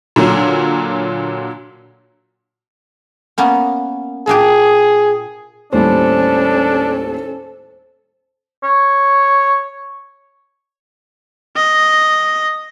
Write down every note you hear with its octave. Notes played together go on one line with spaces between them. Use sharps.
A#2 D3 F#3
A#3 B3 C#4
A#2 D4 G4 G#4
D#2 A2 G3 C#4 D4 A4 C5
C#5
D#5